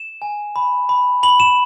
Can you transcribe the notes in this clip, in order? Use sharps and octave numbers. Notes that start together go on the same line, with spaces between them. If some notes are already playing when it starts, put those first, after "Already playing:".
Already playing: E7
G#5
B5
B5
B5 F#7
E7